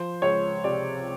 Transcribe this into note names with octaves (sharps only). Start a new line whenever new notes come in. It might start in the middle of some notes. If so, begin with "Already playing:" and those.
Already playing: F3 C5
C#2 C#5
C3 D5